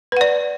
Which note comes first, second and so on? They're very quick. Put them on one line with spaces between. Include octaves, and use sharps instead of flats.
B4 F#5 D5